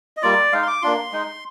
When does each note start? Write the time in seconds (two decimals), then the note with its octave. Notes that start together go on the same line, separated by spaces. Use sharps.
0.17 D#5
0.23 G3 A#3 F4 D5
0.52 G#3 D#4 F5
0.63 C6
0.67 D6
0.82 A#3 D4 F4 C6
1.12 G#3 D#4